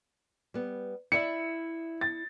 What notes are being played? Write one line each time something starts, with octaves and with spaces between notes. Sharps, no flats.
G3 B3
E4 D5 E5 C#7
A6